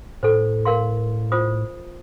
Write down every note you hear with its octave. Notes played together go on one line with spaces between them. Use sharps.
A2 A4 C5
A#4 F5 C6
F4 C5 D#6